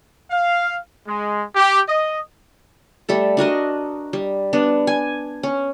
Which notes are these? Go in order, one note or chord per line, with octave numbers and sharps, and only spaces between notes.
F5
G#3
G4
D#5
G3 A3 A4
D4 F#4 A#4 D#5
G3
B3 D4
G#5
C#4